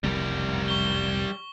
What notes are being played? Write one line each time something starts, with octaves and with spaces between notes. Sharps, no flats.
F1 C2 F#2 G3 A#4
C#6 G7